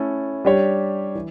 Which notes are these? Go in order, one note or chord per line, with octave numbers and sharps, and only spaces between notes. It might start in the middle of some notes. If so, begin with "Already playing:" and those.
Already playing: A3 C#4 E4 A4
G3 D4 G4 C#5
E3